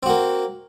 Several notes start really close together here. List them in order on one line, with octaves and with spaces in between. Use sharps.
C4 F#4 A#3